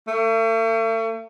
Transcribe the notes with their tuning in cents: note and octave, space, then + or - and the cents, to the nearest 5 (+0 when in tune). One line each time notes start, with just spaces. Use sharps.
A3 +40